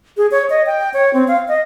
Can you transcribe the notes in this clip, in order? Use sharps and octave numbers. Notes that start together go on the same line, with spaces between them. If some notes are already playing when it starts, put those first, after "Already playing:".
G#4
C#5
D#5
G5
C#5
C4
F5
D#5